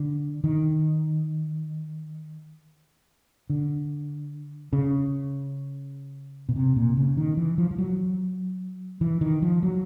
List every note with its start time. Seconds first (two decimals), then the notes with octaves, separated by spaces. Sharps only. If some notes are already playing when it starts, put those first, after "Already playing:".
Already playing: D3
0.44 D#3
3.50 D3
4.73 C#3
6.49 B2
6.56 C3
6.76 A#2
6.97 C#3
7.17 D#3
7.37 E3
7.58 F3
7.71 F3
7.78 F#3
9.01 E3
9.21 D#3
9.42 F3
9.63 F#3